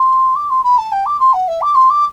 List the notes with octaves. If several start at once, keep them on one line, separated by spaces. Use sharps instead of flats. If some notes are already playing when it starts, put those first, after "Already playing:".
Already playing: C6
D6
C6
B5
A5
G5
D6
C6
F#5
E5
D6
C6
D6